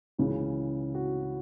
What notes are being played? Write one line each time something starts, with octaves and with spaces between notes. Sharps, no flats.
C#2 C#3 E3
F#4